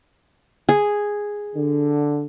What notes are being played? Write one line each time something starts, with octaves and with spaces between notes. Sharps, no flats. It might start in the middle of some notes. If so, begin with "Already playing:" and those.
G#4
D3